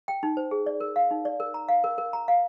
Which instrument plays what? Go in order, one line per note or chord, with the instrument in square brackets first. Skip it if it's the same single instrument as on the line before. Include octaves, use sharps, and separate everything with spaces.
[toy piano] G5
D#4
C5
G#4
D5
A#4
F5
D#4
D5
A#4
A#5
F5
A#4
A#4
A#5
F5